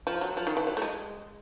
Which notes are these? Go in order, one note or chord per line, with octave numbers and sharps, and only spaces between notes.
F3
F#3
F3
D#3
E3
F#3
A3
G#3